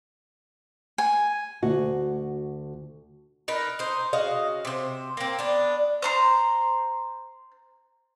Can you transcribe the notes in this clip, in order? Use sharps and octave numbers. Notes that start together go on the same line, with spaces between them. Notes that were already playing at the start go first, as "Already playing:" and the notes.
G#5
D2 F#4
D#4 A#4 B4
D#4 C5
C#3 F#4 D#5 F5
C3 C5
A#3 C4
B3 D4
C5 A#5 C6